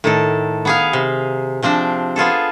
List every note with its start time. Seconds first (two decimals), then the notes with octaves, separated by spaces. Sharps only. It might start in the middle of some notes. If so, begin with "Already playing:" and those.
0.04 A2 D#3 A4
0.65 B3 G#4 F5
0.93 C3
1.63 C3 F3 C4 D4
2.16 B3 F4 G#4 A4